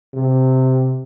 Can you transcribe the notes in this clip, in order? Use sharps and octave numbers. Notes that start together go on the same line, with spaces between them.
C3